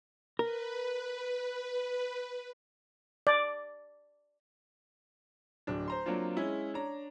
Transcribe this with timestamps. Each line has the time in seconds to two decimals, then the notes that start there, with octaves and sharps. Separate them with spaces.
0.39 A#4 B4
3.27 D5
5.67 D1 D4
5.88 C5 A#5 C6
6.06 F#3 A#3 C4 D4 F4
6.37 G#3 C#4 E4
6.74 D4 C#5 A#5